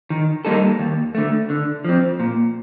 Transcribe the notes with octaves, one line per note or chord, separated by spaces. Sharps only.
D#3
G3 A#3 D#4 A4
D#2
D3 A3
D3
F3 C4
A#2